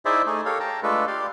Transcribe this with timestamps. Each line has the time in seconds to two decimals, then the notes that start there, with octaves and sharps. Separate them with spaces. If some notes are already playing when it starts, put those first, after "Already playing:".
0.05 D#4 E4 G#4 C5 D5 E5
0.26 A3 D#4 G#4
0.45 G4 A4 A#4 C#5 F5
0.60 G5 A5 A#5
0.83 G#3 A3 D4 F4 A4 B4
1.07 G4 D5 F5 C6